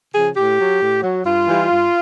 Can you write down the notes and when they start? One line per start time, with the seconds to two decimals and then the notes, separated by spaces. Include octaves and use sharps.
0.13 C#3 F3 G#4
0.36 A2 G4
0.57 F#3
0.80 A2
1.02 F#3
1.24 G2 F4
1.47 E3 G3
1.69 G2